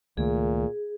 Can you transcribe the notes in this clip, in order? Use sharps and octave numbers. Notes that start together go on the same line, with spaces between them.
C#2 A#2 D#3 A3 G#4